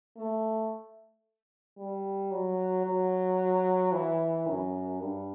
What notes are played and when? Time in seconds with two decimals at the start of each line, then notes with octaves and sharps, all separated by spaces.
0.17 A3
1.78 G3
2.31 F#3
2.86 F#3
3.93 E3
4.47 F#2
5.00 G2